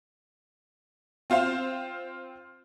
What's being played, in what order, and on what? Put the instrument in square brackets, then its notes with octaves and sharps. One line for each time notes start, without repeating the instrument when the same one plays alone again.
[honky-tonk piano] C4 F4 C5 F5